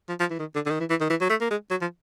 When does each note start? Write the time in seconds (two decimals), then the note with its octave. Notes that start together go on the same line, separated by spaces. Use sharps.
0.09 F3
0.20 F3
0.30 E3
0.40 D#3
0.55 D3
0.66 D3
0.70 D#3
0.80 E3
0.90 E3
1.01 D#3
1.10 E3
1.21 F#3
1.30 A3
1.41 A#3
1.51 G#3
1.71 F#3
1.81 F3